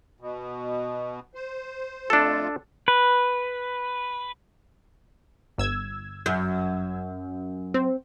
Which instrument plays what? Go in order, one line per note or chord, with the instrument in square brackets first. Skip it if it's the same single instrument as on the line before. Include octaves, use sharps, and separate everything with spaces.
[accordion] B2
C5
[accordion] F2 A3 F4 [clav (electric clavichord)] D4 A4
[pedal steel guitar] B4
[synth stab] G1 E6 G#6
[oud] F#2
[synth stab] C4